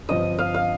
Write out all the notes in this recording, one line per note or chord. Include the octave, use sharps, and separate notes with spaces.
G1 G2 F3 C4 D#5
F5
F5